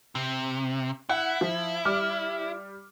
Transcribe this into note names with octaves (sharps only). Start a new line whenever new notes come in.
C3
E4 F#5
F3
G3 D6 F6